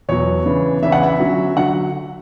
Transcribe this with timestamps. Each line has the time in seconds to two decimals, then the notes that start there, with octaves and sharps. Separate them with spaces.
0.09 E2 B2 F#3 C#5
0.46 C#3 E3 B3 D4
0.82 C#3 E3 B3 D4 E5
0.92 F#5
1.03 E5
1.20 D3 F#3 C#4
1.56 D3 F#3 F#5